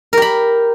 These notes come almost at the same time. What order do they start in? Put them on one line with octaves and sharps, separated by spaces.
A#4 G4 B5